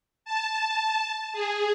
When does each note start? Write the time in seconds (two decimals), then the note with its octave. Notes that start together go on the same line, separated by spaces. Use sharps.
0.25 A5
1.33 G#4